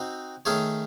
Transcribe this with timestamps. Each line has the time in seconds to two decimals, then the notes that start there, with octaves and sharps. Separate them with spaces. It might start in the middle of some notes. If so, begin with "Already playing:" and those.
Already playing: C4 D#4 F#4
0.45 D#3 A3 C#4 G#4 C#5